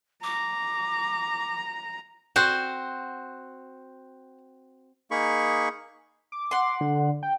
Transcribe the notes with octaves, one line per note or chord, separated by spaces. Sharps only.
A#5 D6
C4 F#4 C5 F#5
A#3 D#4 G#4 B5 C#6
D6
F#5 C6
D3
G5